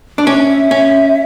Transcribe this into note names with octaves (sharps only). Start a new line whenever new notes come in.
D4
C#4 E5
C#4